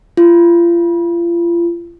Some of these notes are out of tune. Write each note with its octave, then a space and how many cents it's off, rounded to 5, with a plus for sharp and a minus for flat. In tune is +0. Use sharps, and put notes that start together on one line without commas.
F4 -35